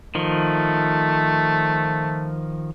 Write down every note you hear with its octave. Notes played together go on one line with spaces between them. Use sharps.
D#3 F3 A3